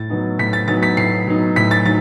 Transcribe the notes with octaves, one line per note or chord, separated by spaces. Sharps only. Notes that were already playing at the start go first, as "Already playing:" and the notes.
Already playing: A2 A6
F#3 B3 D#4
A2 B6
A6
F#3 B3 D#4 A6
B6
A2 C7
F#3 B3 D#4
A2 B6
A6
F#3 D#4 A6